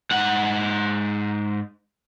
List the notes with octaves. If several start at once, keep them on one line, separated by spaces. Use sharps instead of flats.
G#2 F#5